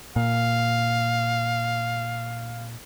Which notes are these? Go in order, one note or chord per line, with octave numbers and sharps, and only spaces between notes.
A#2 F5